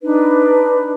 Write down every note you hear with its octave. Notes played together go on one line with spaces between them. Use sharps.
D4 D#4 B4